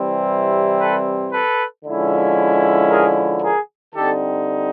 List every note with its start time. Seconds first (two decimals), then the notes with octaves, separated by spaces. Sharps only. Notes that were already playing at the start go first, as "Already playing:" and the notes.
Already playing: C3 E3 G3 C4 E4
0.80 A4 B4
1.32 A4 B4
1.85 D3 F3 G#3 C#4 E4
2.90 G#4 A#4
3.42 G#4 A#4
3.94 D3 G3 C4 D#4 G4 A4